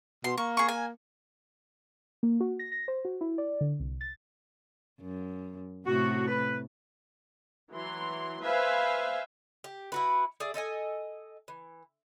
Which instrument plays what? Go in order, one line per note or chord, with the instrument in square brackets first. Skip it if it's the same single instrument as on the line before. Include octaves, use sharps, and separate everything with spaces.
[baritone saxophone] B2 [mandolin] C6
[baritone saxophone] A#3 [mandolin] C#6
[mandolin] G#4 C#6
G#5
[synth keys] A#3
F#4
A#6
A#6
C5
F#4
E4
D5
D3
C2
A6
[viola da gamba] F#2
[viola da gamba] A2 C3 A3 [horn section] F#4
[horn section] B4
[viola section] E3 F#3 C6
B4 C5 E5 F5 G#5
[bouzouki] G4
E4 F#4 B4
G#4 D5 E5
A4 D#5 E5 G#5
E3